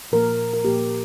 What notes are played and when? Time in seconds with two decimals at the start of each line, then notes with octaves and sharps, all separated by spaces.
0.12 A#2 F3 A#3 A#4
0.54 A#4
0.64 A#2 F3 A#3 G4